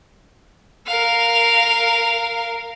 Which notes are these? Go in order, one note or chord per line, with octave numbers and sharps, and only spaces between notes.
A#4 F5